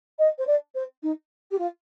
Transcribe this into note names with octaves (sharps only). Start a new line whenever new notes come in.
D#5
C5
D5
C5
D#4
G4
F4